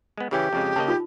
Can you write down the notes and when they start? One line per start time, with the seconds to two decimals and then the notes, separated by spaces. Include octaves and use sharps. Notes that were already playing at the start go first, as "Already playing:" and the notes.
0.18 G#3 B3
0.31 C#3 E3 C#4 G4
0.53 F2 C#3 G#3
0.76 C#3 A#3 D#5 A5
0.88 D#4 F4